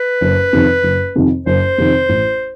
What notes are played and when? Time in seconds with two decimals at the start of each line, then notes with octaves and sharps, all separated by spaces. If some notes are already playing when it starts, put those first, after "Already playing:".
Already playing: B4
0.21 F#1
0.53 F2 C3 D#3
0.83 F#1
1.16 F2 C3 D#3
1.46 F#1 C5
1.78 F2 C3 D#3
2.09 A1